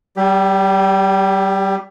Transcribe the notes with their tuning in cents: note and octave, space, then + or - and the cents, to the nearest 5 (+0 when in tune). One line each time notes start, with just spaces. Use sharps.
G3 -25 G4 +20